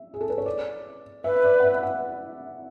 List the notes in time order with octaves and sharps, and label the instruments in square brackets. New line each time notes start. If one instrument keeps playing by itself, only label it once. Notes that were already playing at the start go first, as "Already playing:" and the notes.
Already playing: [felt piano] E5
G#4
A4
B4
C#5
D5
[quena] B4 [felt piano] E5
[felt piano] D5
F#5
E5
E5
F#5